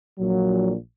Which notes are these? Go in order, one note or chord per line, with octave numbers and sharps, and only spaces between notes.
A#1 A#2 F#3